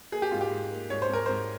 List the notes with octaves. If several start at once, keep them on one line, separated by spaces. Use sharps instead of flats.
A#3 G#4
G4
G#2 F4
G4
G#2
A#3
G#2 C#5
C5
G#2 A#4
G#2 C5